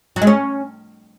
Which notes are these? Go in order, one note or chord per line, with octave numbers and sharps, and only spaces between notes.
F#3
G#3
C#4